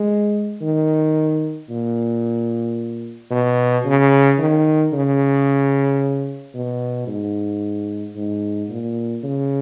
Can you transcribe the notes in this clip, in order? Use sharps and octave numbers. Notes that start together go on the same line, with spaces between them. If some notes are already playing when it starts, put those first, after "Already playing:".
Already playing: G#3
D#3
A#2
B2
C#3
D#3
C#3
B2
G#2
G#2
A#2
C#3